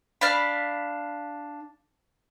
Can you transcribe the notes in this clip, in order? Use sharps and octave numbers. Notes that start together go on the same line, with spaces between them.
D4 F5 B5